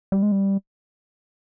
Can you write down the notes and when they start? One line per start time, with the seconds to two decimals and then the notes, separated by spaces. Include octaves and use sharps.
0.12 G3
0.23 G#3
0.32 G3